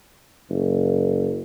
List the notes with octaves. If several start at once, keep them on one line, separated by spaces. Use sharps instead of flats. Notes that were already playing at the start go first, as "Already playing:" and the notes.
F#1